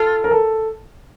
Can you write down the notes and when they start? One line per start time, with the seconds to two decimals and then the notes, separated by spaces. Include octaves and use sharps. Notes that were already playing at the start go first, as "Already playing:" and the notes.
Already playing: F4 A4
0.24 A#4
0.31 A4